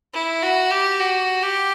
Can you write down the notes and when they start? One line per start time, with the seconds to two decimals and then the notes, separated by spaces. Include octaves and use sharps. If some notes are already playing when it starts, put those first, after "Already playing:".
0.14 E4
0.43 F#4
0.71 G4
1.00 F#4
1.43 G4